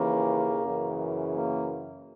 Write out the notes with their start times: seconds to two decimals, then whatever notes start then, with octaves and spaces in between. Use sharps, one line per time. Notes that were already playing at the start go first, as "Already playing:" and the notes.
Already playing: D#2 C#3 E3 A#3
0.64 F#2 C#3 E3
1.32 A#3